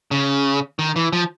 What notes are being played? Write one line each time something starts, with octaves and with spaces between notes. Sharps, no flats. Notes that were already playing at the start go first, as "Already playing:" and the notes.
C#3
D#3
E3
F3